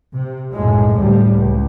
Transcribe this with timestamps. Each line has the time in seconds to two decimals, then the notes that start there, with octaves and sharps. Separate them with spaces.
0.14 C3
0.53 B1 F#2 A2 G#3
0.97 D2 A2 G3
1.33 C#2